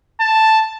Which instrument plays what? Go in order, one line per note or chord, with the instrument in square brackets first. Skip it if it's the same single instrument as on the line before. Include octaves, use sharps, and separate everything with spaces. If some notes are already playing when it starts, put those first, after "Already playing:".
[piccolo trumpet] A5